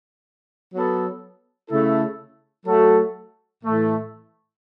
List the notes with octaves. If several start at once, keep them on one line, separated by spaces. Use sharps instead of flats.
F#3 B3 A4
C#3 A3 E4 A4
F#3 A3 F#4 A4
A2 E3 A3